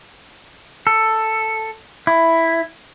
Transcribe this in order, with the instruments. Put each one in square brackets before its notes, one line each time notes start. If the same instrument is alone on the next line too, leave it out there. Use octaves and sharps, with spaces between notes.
[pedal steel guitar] A4
E4